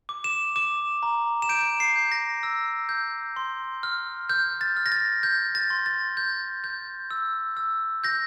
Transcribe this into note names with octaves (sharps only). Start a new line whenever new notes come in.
D6
E7
D6 E7
A#5
E7
G6 D7
C7
G6
A#6
E6
G6
C6
F6
F6 G6
A6
F6
A#6
A6
G6
A6
C6
A6
G6
G6
E6
E6
G6 A#6